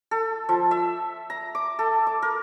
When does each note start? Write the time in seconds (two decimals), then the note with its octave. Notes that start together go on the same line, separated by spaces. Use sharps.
0.11 A4
0.49 F3
0.71 E5
1.30 A#5
1.55 D6
1.79 A4
2.07 D6
2.22 A#4